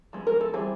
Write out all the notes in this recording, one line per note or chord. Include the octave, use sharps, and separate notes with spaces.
F3 G#3 B3
A#4
A4
E3 G3 C4 G#4